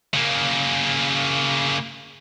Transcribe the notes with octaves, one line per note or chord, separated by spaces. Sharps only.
C#3 A#3